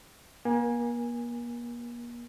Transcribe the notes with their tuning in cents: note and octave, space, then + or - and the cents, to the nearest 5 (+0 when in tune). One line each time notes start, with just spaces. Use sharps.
A#3 +40 G#5 -15